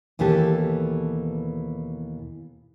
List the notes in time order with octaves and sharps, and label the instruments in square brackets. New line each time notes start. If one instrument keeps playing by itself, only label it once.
[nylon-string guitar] D#2 B2 E3 G4 A4